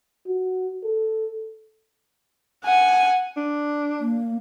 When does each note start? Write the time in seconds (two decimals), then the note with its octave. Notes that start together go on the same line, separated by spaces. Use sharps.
0.27 F#4
0.84 A4
2.65 F#5 G#5
3.37 D4
4.00 A#3